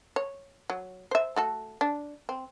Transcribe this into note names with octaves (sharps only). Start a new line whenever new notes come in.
C#5
F#3
C5 E5
A3 F#4 A4
D4
C4